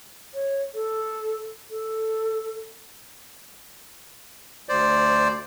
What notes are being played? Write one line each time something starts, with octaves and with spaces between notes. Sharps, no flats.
C#5
A4
A4
D2 C5 D5